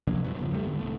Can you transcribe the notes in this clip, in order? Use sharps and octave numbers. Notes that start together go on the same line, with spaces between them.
C3 F3 A#3 D4
G2 F#3 B3
E1 C#3 F3
E2 G3 A3
G#2 D3 B3
C2 A3